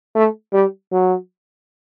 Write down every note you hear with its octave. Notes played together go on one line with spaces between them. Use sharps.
A3
G3
F#3